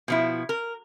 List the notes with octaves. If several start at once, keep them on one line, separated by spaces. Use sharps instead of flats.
B2 F3 E4
A#4